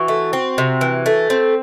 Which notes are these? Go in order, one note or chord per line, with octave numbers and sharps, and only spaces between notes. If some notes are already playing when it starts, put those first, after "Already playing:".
Already playing: E3 F#4
A3
C4
C3
E3
A3
C4